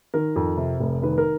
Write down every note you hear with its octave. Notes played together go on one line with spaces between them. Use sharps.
D#3 A#4
F2
C3
F1
D#3 B4
A#4